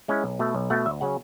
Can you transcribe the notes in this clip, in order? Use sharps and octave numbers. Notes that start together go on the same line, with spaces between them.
G#3 C#4 E4
B1
B2 A3
B1
B2 A3 F#5
D2 E5
C#3 F#3 C#4 F#5